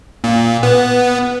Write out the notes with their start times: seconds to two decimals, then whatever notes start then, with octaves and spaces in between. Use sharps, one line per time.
0.24 A#2
0.63 B3